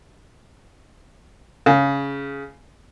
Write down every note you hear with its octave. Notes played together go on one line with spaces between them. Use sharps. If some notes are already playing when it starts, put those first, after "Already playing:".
C#3